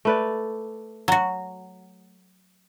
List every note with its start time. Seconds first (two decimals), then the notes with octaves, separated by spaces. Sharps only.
0.05 A3 B4 D5
1.08 F#3 F#4